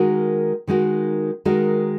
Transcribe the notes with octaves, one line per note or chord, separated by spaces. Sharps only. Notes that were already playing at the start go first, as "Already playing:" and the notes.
Already playing: D#3 G#3 D#4 F#4 A#4
D#3 G#3 D#4 F#4 A#4
D#3 G#3 D#4 F#4 A#4